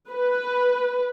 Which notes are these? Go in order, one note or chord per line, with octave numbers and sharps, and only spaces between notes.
B4